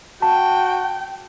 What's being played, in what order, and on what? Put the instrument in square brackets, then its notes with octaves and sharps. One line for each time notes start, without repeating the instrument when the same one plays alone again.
[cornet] F#4 [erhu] G5 [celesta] A5